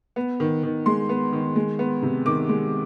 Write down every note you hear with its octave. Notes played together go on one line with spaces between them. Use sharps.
B3
D#3
D#3
G#3 C6
B3
D#3
G#3
B3
C3
D#3 D6
G#3